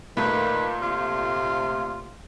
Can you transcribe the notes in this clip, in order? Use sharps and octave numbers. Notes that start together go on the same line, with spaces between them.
A#2 D#3 A3 B4
C3 F4